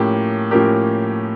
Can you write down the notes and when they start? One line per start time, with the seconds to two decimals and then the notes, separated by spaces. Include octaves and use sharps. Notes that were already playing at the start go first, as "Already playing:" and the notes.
Already playing: A2 F3 A#3 C#4 G4
0.51 A2 F3 A#3 C#4 G4 A#4